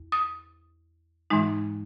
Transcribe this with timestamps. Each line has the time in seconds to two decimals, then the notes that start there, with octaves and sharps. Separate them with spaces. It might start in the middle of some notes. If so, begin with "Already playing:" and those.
Already playing: E2
0.12 D#6
1.30 G#2 E3 G#3 D#4